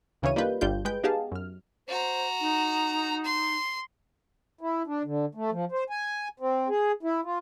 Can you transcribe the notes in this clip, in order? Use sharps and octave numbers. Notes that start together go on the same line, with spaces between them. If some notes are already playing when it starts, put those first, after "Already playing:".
D2 C#3 E3 C#5 D#7
G3 A#3 D#4 F4 B4 G6
G1 G3 D4 F4 G6
G#3 B4 G5 G6 D7
B3 D#4 G4 G#4 F5 A5
F#2 F6
F#4 C5 A#5
D#4
C6
E4
D4
D3
A3
F3
C5
G#5
C4
G#4
E4
F4